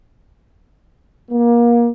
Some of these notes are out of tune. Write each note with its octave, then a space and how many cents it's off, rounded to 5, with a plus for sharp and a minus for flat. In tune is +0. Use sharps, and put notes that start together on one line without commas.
A#3 +25